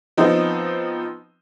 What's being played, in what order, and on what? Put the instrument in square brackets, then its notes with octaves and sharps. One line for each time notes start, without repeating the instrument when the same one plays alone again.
[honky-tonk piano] F3 B3 C4 D#4